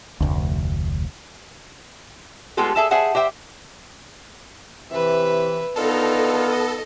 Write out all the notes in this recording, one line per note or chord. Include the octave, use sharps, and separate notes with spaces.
F1 D2
G#3 A3 B3 F4 G4 A4
G#4 A4 E5 G#5 A5
G#4 C5 E5 F#5 G#5 A5
G4 C5 E5 G5
C3 E3 B4 E5
D3 D#3 B3 D#4 F4 A4 A#4
D#5